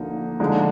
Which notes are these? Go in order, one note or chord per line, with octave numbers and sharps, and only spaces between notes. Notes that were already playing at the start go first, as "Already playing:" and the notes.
Already playing: D2 D3 F3 A#3 D#4
D3 F3 G#3 D#4